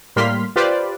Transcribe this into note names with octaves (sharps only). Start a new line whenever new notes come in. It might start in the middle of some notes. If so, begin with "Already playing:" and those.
A2 G3 A#3 C6 F6 B6
F4 G4 B4 C5 D5